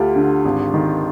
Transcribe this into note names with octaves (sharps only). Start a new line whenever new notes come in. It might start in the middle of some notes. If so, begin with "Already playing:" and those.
Already playing: D2 D3 F4 G4
D3
G#1
D#3